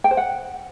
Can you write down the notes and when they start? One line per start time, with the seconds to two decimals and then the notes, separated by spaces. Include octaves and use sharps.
0.04 G5
0.11 C5
0.17 F#5